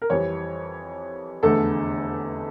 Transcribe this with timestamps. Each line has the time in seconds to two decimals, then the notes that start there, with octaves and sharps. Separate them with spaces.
0.02 A#4
0.10 F2 E3 G3 C#5
1.43 F1 E2 D3 A3 A4